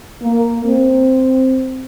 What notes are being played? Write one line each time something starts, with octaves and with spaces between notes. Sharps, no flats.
A#3
C4